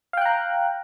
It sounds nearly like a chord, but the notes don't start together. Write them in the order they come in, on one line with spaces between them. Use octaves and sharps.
F5 G5 F#6 A#5